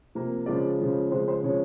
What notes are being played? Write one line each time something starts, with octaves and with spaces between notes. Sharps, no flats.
C3 F3 A#3
C#3 F3 G#3 D5
C#3 F3 G#3
C#3 F3 G#3 C5
C5
C#3 F3 G#3 C#5